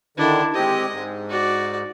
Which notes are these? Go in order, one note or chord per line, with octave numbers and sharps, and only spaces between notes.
D3 D#3 D4 E4
G#3 C4 G4 D#5
G#2
F#4 D5